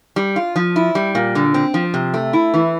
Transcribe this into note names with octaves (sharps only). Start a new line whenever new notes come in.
G3
F4
F3
E4
G3
A#2
D3
C4
F3
C3
A3
E4
E3